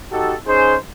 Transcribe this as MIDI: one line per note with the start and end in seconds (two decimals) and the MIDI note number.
0.12 0.35 63
0.12 0.35 66
0.12 0.35 67
0.12 0.35 69
0.47 0.75 61
0.47 0.75 63
0.47 0.75 68
0.47 0.75 72